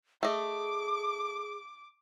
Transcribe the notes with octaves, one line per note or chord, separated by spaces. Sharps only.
A3 G#4 D#5 D6